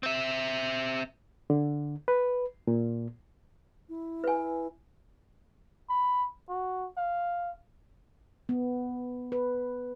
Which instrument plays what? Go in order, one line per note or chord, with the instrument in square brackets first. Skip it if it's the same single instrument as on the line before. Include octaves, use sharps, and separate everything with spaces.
[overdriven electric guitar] C4 E5
[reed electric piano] D3
B4
A#2
[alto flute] E4
[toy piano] B4 G#5
[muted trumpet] B5
F#4
F5
[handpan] B3
B4